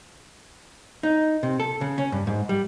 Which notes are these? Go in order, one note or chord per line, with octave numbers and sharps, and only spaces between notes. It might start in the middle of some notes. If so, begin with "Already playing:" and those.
D#4
C3
A4
C#3
C#4
G2
G#2
G3